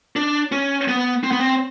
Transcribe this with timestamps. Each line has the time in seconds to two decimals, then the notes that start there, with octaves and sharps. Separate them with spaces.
0.16 D4
0.52 C#4
0.88 B3
1.24 C4
1.31 B3
1.40 C4